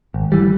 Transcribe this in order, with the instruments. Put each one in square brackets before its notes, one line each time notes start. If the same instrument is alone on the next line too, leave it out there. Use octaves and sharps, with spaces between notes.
[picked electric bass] G#1
E3 G3